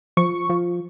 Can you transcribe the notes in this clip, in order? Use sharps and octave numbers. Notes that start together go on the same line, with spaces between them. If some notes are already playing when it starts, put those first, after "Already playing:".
F3 C#6
F3